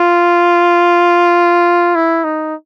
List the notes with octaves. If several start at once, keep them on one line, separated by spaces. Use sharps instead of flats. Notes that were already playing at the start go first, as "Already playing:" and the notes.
Already playing: F4
E4
D#4